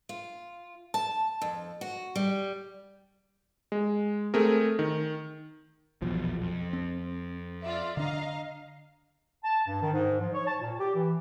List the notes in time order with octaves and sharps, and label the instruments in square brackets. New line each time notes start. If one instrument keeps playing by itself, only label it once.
[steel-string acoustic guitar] F4
A5
F2
F#4
G3
[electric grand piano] G#3
A3 C4 G#4 A#4
D#3
[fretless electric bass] A#1 B2 F#3 [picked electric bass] E2 F3
[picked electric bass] F2
[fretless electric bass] C4
[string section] F4 D5 E5
[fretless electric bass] D3 D4 [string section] D#5 F5 A#5
[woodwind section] A5
G2
D#3
G#2
F3
C#5
A5
A#2
G4
E3